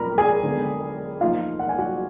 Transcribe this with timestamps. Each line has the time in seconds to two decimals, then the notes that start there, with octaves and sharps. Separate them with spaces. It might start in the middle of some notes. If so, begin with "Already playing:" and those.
Already playing: A#2 F3 A#3 F4 A#4 A#5 B5
0.18 G#4 G#5
0.43 D3 G#3 B3
1.21 F3 A#3 D#4 F4 F5
1.59 F#5
1.69 G#5
1.78 F#4 F#5